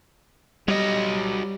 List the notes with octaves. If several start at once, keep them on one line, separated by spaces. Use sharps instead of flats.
F#3 G3 D#5